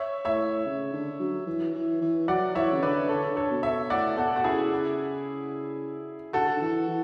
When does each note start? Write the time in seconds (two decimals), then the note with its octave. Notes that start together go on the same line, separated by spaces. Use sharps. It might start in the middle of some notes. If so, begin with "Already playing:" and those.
Already playing: C#5 E5
0.25 A2 C#5 E5
0.66 C#3
0.93 D3
1.20 F#3
1.47 E3
1.74 E3
2.01 E3
2.28 F#3 D5 F#5
2.55 E3 C#5 E5
2.72 C#3
2.82 D3 B4 D5
3.09 D3 A4 C#5
3.37 A4 C#5
3.50 B2
3.63 C#5 E5
3.90 A2 D5 F#5
4.17 B2 F#4 A4
4.36 F#4
4.44 C#3 E4 G#4
6.33 D3 F#4 A4
6.56 D3
6.61 E3
6.88 E3